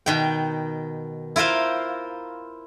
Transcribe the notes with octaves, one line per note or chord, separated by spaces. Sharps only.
B2 D#3 G5
E4 F4 A#4 C5 F5